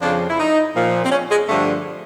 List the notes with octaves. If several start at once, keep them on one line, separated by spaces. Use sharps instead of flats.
F2 C#3 F3 D4
E4
D#4
A#2 F3
C4
C#4
G#3
G2 D3 F3 A3